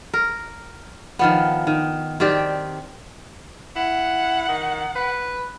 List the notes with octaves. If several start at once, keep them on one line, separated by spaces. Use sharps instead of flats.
A#4
D#3 F3 B3
D#3
D#3 C4 G4 D5
E4 F#5
D#3
B4